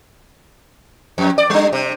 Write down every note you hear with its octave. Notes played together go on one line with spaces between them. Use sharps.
F2
D5
G3 D4
C3